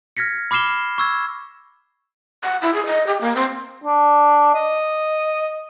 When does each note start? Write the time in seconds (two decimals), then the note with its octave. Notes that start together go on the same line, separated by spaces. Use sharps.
0.17 F6 G#6 A#6 B6 C#7
0.51 B5 D6 F6 C7 E7 G7
0.98 C#6 E6 G#6
2.44 F#5
2.62 E4
2.74 G#4
2.86 D#5
3.07 G4
3.21 A#3
3.36 C4
3.84 D4
4.54 D#5